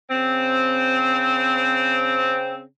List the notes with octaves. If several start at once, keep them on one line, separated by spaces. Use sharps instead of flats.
C#3 C4